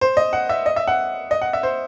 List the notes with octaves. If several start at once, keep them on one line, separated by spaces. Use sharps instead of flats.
C5
D#5
F#5
E5
D#5
E5
F#5
D#5
F#5
E5
C5